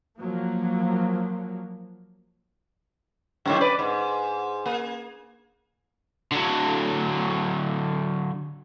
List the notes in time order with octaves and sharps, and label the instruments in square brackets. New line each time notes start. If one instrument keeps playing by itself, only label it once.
[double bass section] F3 F#3 A#3
[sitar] F#2 A2 D#3
B4 D5
G#2
A#3
[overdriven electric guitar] D3 F#3